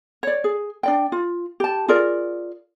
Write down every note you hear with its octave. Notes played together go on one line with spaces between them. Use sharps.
C#5 D5
G#4
D4 D5 G5
F4
G4 A5
F4 G#4 A#4 D5